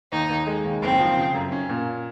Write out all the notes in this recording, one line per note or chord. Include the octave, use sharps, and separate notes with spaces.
D#2 D#4
D#2
G#3
D#2
F#1 C4
F3
C#3
F#2
C#4
A#2